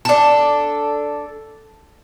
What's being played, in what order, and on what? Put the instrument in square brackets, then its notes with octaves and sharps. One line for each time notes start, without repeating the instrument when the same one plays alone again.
[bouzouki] D4 A4